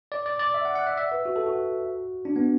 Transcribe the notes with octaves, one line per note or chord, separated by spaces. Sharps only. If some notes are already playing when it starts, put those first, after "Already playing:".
D5
D5
D5
E5
F#5
F#5
E5
E5
B4
F#4
A4
F#4
D4
B3